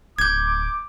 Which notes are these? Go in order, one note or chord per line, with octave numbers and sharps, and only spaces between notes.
D1 D6 G6 G#6